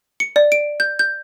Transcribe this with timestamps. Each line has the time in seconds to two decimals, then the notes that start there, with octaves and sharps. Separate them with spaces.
0.20 C#7
0.36 D5
0.52 D7
0.80 G6
0.99 G6